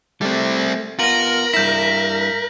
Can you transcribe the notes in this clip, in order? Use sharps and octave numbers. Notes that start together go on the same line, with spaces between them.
G3 A3 C4
B3 F4 A#4 A#6 F#7
G2 E4 G6 B6